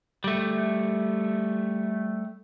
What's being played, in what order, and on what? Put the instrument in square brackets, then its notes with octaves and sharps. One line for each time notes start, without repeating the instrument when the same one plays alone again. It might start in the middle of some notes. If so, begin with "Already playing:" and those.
[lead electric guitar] G3 A3